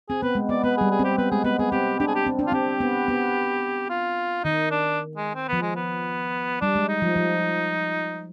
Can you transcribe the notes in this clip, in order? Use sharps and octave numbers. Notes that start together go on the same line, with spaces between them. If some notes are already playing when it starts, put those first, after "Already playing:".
C4 G#4
B3 B4
G#3
B3 D5
B3 B4
G3 G#4
G#4
C4 G4
B3 B4
G#3 G#4
B3 B4
B3 G#4
C4 G4
D4 G4
G#4
G4
C4
D4
F4
C4 G4
B3
B3
F4
D#3 D#4
D4
G#3
C4
F3 B3
G#3
B3
G3 D4
G#3
D#4
F3
F3